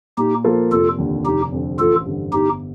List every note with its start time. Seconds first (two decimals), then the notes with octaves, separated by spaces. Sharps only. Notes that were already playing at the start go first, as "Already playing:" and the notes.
0.17 A#2 D#4 G4
0.44 F3 A#3 F4 A4
0.71 F1 F4 A4
0.98 D#2 D3
1.25 F1 D#4 G4
1.52 F2 D3
1.79 A1 F4 A4
2.06 G2 D3
2.33 G1 D#4 G4